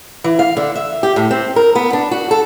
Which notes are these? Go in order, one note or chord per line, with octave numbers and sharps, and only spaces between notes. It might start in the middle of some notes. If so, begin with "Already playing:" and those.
E3
F5
D3
E5
G4
A2
C4
A#4
B3
D4
F#4
A4